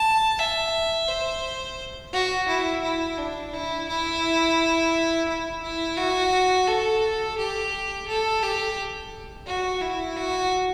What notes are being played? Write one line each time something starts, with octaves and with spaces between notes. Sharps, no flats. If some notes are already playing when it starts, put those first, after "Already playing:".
Already playing: A5
E5
C5
F#4
E4
E4
D4
E4
E4
E4
E4
F#4
A4
G4
A4
G4
F#4
E4
F#4